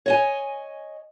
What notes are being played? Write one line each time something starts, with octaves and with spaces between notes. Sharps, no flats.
C#5 D#5 G#5